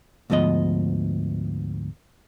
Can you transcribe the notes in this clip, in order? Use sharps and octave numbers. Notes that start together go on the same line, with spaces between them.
D2 G#2 F3 B3 D#5